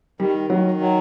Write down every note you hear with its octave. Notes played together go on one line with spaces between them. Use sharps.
D#3 G3
D#3 F#3
F#3